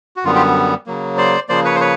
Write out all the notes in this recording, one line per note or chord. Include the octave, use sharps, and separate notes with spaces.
F#4
F#2 D3 G3 B3 F4
F4 G4
C#3 F#3 A#3
C5 D5
C#3 F3 A#3 C5 D5
B4 C#5
C5
B4 C#5